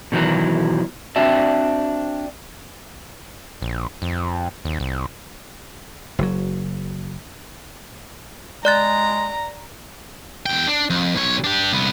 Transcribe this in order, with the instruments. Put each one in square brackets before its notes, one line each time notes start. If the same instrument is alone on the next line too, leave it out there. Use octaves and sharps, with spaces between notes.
[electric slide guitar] B2 D#3 E3 F#3
C4 D4 F#4 D5 E5
[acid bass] A#1
F2
D#2
C2
[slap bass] F#1 F#3
[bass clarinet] G#3 [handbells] D5 F#6 A6 [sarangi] A#5
[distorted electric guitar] E2 G5
D4
F2
B1 C#5
D4 G4
C2 B3